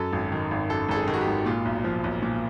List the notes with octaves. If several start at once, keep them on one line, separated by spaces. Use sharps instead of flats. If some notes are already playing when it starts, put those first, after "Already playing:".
Already playing: F#2 A4
G#1
D#3
G#1
F#2 A4
G#1 A4
G#4
D#3
F#4
G4
G#1
A#2 F4
B1
F3
B1
A#2